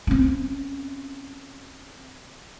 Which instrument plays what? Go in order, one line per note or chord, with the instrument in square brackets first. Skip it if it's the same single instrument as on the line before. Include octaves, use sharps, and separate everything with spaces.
[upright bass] C4 C#4